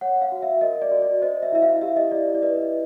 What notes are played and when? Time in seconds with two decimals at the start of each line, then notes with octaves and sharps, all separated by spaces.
0.01 C#5 F#5
0.22 F5
0.32 F#4
0.42 E5
0.61 A#4 D#5
0.82 D5
0.91 F#4
1.02 D5
1.22 C5 D#5
1.42 E5
1.52 E4 E5
1.62 F5
1.82 G4 E5
1.97 D#5
2.12 E4 D5
2.34 D5
2.42 B4 D#5